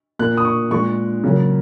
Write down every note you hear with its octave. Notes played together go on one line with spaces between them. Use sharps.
A#2 A#3 F#6
D#6
C#6
A#2 G#3 C#6
C#3 F#3 A#3